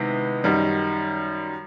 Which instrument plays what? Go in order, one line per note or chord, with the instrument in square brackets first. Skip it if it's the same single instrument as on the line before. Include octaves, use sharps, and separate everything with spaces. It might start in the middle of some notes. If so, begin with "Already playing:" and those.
Already playing: [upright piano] C3 D#3 G#3 B3 E4
F#2 D#3 G3